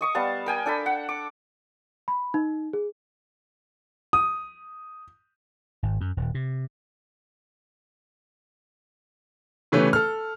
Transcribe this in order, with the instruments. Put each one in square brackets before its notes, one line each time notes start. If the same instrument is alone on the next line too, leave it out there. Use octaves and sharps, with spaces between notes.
[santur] D#5 C#6 D#6
G3 B3 F5 A5
A#4 G5 G#5
D4 A4 A5 B5
F#5
D6
[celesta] B5
D#4
G#4
[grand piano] D#6
[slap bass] G#1
F#2
D#1
C3
[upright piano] C#3 E3 A3 G4 B4 C#5
A4 F6